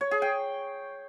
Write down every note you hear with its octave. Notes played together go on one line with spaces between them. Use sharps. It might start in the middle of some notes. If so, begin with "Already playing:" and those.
C#5
G#4
G5